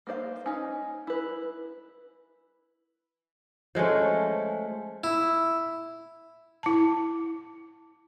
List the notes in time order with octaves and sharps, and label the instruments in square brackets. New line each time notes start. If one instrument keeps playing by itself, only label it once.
[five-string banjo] A#3 B3 C5 D5 F5
C#4 D#4
E4 B4
[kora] F3 G#3 A3 C#4
[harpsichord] E4
[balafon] E4 A5